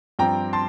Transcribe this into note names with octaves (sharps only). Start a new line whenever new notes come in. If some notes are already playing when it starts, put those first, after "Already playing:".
G2 F3 C4 G5 A#5
A5 C6